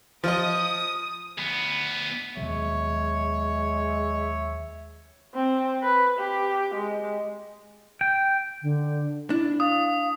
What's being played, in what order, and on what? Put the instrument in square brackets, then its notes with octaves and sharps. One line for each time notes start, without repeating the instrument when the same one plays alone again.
[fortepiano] F3 D#5 [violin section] D#6
[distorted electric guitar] D2 B3
[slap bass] D#2 B2 F#3 [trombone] G#3 [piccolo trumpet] C#5 [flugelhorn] E5
[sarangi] C4
B4
G4
G#3
[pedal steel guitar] G5
[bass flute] D3
[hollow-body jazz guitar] D4 [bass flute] E4
[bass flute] F5 [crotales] D#6